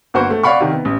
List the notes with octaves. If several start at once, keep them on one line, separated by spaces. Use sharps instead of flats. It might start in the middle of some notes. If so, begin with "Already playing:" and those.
G1 A#3 F#4 B4 C5 C#6
A3
C#5 D5 F5 F#5 B5 C#6
C3 D#3
B3
A1